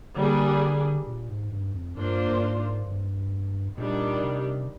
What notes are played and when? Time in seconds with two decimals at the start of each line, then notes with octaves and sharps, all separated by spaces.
0.16 D3 G3 A#3 D4 G#4
1.07 A#2
1.29 G#2
1.52 G2
1.74 F2
1.96 G2 A#3 D4 F4 C5
2.32 G2
2.42 G#2
2.87 G2
3.78 A#2 D#3 G3 D4 G4
4.23 C3